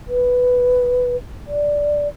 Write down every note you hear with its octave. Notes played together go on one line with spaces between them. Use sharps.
B4
D5